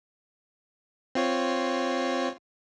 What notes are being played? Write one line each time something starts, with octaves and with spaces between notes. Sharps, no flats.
C4 F4 C#5